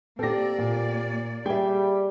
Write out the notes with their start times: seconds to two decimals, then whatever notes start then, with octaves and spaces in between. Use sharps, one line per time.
0.19 A#3 C4 G4 A4 D5 A#6
0.58 A#2
1.46 G3 G#4 E5 G5